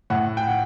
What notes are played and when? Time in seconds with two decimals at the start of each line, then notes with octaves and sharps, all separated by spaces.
0.10 A2 F#5
0.37 G5
0.47 F#5